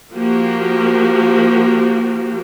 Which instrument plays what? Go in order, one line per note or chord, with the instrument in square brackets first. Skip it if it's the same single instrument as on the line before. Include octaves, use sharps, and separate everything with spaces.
[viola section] F3 A#3 F#4 G4